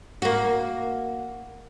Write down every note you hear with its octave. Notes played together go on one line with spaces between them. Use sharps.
A#3 F#4